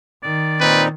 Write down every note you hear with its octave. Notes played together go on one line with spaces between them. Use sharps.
D#3 D5
A#2 C4 D#4 B4